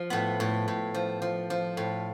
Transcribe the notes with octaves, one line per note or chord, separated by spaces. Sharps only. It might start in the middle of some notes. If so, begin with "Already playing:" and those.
Already playing: F3
A2 B3
A2
A2
F3
F3
F3
A2